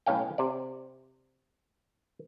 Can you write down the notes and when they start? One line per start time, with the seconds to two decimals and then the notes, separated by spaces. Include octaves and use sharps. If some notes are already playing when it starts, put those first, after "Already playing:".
0.06 B1 A2 C#4 F5 G5
0.38 C3 D5